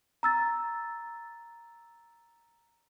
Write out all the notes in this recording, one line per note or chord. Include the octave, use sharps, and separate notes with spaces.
A#5 E6 A6